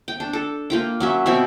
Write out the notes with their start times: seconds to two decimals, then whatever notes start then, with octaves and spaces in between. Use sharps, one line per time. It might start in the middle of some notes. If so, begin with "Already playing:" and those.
0.08 G5
0.20 D4
0.33 A4
0.70 A#3 F4 G5
1.00 F#3 C#4 E5
1.26 B2 C4 E5